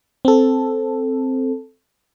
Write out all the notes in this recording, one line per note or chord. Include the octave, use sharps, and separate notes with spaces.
C4 A4